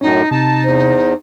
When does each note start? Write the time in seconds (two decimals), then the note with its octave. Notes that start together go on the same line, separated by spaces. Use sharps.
0.01 F#2 A2 C#4 D#4 C#5
0.31 C3 D#4 A5
0.64 E2 C5